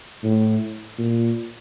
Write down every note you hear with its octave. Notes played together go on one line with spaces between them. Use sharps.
A2
A#2